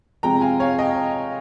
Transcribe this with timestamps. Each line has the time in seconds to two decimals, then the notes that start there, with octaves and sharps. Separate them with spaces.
0.23 C3 F3 G#3 G5 A#5
0.41 F5 G#5
0.60 C#5 F5
0.79 D#5 G5